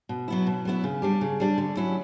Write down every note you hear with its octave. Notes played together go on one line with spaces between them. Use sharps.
B2
F#3 B3 E4
B2
F#3 B3 E4
C#3
G3 D4 G4
C#3
G3 D4 G4
D3
F#3 C#4 E4